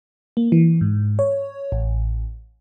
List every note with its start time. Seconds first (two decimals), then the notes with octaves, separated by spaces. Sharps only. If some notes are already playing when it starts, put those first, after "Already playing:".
0.37 A#3
0.52 E3
0.81 G#2
1.19 C#5
1.72 A1